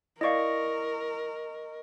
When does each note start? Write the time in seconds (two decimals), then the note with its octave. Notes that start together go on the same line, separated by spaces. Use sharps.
0.21 E4 A#4 D5 D#5 F5 C#6